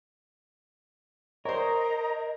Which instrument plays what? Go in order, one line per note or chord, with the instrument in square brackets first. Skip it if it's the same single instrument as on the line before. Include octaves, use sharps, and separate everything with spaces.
[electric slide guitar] A#4 [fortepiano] C5 C#5 [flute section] D#5 A#5